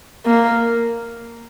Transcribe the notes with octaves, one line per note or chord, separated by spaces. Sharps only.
A#3